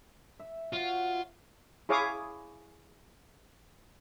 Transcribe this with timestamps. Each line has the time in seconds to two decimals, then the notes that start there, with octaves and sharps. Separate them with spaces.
0.39 E5
0.73 F4 F#4 C#5
1.89 E4 G#4 C#5 F5 D6 D#6